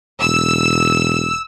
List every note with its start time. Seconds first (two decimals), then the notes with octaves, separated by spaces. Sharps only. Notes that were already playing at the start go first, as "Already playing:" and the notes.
0.21 E1 E6